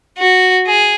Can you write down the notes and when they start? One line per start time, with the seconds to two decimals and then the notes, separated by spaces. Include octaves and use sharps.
0.18 F#4
0.67 G#4